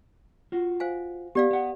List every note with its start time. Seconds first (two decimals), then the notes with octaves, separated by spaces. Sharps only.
0.52 F4 F#4
0.80 C5 F5 G#5
1.35 B3 G4 D5 F5
1.51 B3 F#5